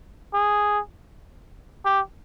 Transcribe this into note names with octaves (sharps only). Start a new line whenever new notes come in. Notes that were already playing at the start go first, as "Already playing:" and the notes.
G#4
G4